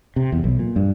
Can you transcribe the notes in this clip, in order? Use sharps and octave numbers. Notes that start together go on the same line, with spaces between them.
C3
E2
B1
A#2
G2